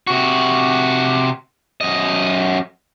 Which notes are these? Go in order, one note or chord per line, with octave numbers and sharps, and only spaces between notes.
C3 F#4
F#2 D#5